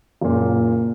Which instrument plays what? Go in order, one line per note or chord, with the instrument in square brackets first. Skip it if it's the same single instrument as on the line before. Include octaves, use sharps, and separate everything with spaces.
[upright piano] F#1 A#2